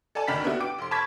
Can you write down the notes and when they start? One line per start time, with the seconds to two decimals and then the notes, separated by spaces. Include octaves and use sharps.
0.15 A4 D5 G#5 A5
0.27 D2 D#3 D4 A#5 B5 B6
0.44 B3 D4 E4 F#4
0.60 G5 D6 D7
0.78 F1 C6
0.91 A5 B5 C#6 D6 G#6 B6